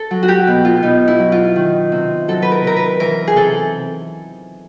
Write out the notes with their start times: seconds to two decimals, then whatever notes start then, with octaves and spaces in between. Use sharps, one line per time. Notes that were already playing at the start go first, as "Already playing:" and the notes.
Already playing: A4
0.11 F#3
0.23 F#4
0.28 G4
0.47 B2
0.65 F4
0.83 B2 D#4
1.08 E4
1.19 F#3
1.32 F4
1.56 D#3
1.92 C3
2.28 F#3 A4
2.42 B4
2.52 A#4
2.64 C3 A#4
2.76 B4
3.00 E3 A#4
3.27 G#4
3.36 C3 A4